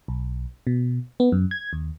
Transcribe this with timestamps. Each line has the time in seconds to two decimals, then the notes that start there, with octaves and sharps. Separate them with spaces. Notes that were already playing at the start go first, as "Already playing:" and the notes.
0.08 B1
0.67 B2
1.20 B3
1.32 F#2
1.51 G#6
1.73 D#2